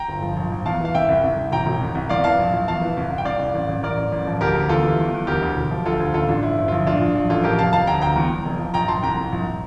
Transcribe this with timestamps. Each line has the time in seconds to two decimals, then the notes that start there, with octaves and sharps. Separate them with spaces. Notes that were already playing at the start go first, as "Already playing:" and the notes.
Already playing: G5 A#5
0.08 G1
0.22 F3
0.37 A#1
0.52 A#1
0.65 E2 F5 A5
0.80 E3 F5
0.95 C2 E5 G5
1.09 C2
1.24 C2
1.37 C2
1.52 E1 G5 A#5
1.66 E1
1.81 C2
1.95 C2
2.09 E2 D5 F5
2.24 E3 F5 A5
2.38 A#1
2.53 A#1
2.68 E2 F5 A5
2.82 E3
2.97 C2
3.11 C2
3.18 G5
3.25 C2 D5 F5
3.39 C2
3.54 A1
3.69 A1
3.83 A1 A#4 D5
3.98 A1
4.12 A1
4.27 F3
4.40 D2 G4 A#4
4.55 D2
4.69 E2 F4 A4
4.84 E3
4.99 E2
5.14 E2
5.27 D2 G4 A#4
5.42 D2
5.57 E1
5.71 F3
5.86 D2 F4 A4
6.00 D2
6.14 A1 F4 A4
6.28 A1 D4 F4
6.43 G1 E4
6.58 G1
6.68 F4
6.72 A#1 E4
6.86 A#1 D4 F4
7.02 A#1
7.15 A#1
7.29 A1 F4 A4
7.44 F3 G4 A#4
7.58 F1 F5 A5
7.73 F1 F5 A5
7.87 D2 G5 A#5
8.01 D2 G5 A#5
8.16 E2
8.30 E2
8.45 F1
8.59 F3
8.74 A#1 G5 A#5
8.88 A#1 A5 C6
9.03 C2 G5 A#5
9.17 C2
9.33 A#1